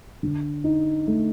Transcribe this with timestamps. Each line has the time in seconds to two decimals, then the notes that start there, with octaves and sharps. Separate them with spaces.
0.23 D3
0.64 D#4
1.07 A3